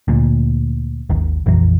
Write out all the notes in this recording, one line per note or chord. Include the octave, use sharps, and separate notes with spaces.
D2 A#2
G#1 D#2
A#1 F2 E3 F#3